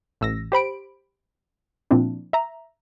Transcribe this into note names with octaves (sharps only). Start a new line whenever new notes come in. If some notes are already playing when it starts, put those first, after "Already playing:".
A1 E6 A#6
G4 C5 B5 D7
A#2 F3 C4 D4 E4
E5 A#5